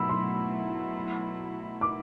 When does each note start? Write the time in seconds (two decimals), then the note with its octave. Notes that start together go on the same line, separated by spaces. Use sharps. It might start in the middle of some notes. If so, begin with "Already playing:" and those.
Already playing: B2 F#3 A3 E4 B5 E6
0.09 C6
1.81 D6